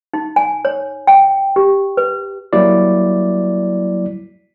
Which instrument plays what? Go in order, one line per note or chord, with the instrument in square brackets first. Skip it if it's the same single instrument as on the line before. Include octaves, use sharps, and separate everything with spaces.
[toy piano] D#4
G#5
C#5
G5
G4
B4
[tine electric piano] F#3 G3 A#3 E4 D5